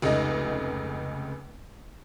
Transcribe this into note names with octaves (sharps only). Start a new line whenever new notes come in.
F1 C#2 A3 D#4 D#5